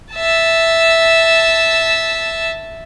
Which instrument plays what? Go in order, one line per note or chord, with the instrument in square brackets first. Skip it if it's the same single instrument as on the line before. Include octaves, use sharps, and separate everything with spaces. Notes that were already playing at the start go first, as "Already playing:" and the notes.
[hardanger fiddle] E5 A5